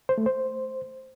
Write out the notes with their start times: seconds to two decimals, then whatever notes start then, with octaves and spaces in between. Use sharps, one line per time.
0.09 C5
0.18 A3
0.26 C5